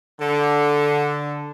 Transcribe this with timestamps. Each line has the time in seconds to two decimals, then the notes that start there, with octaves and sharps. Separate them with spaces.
0.20 D3